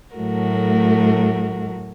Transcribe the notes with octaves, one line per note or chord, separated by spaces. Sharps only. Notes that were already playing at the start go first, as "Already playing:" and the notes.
A2 F#3 A3 F#4 A#4